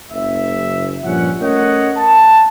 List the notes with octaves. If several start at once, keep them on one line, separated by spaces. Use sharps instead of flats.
F#1 E5
G2 A#2 F3 C#4 F#5
A3 C#4 A#4 C#5 D#5 F#5
A5